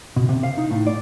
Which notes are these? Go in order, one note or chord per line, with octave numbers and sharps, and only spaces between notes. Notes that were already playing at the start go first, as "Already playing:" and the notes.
B2
C3
F5
D#4
A2
D5